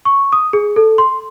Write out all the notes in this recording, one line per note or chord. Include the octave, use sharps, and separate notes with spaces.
C#6
D#6
G#4
A4
C6